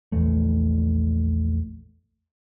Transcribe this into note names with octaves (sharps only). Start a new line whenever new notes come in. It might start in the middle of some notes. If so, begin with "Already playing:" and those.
A#1 E2 E3 A3